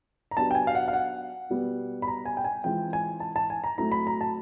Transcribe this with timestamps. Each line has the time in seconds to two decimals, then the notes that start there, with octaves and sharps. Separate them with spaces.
0.31 A#5
0.37 F#3 B3 D4 G4 A5
0.51 G5
0.55 G#5
0.67 F5
0.75 F#5
0.88 F5
0.93 F#5
1.50 B2 G3 B3
2.02 B5
2.08 A#5
2.25 G#5
2.37 G5
2.44 G#5
2.64 E3 G#3 C4 F4 G5
2.93 G#5
3.20 A5
3.36 A5
3.50 G#5
3.64 A#5
3.78 F#3 A3 C4 E4 A#5
3.92 B5
4.07 A#5
4.21 A5